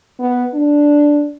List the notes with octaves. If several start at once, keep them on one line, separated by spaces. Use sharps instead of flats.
B3
D4